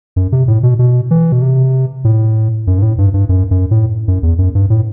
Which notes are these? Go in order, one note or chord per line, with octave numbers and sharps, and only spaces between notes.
F#2
C3
A2
B2
B2
E3
B2
C3
A2
F#2
G2
A2
G2
G2
F#2
F#2
A2
F#2
E2
F#2
G2
A2